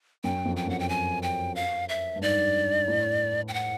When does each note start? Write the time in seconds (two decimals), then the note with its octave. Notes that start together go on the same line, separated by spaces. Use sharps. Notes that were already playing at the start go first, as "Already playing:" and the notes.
0.24 F#2 G5
0.45 F2
0.56 G5
0.67 F#2 F#5
0.79 G5
0.89 G#5
1.23 G5
1.56 F5
1.89 E5
2.16 G2
2.21 G#2 D5
2.88 A2
3.48 G5
3.54 F#5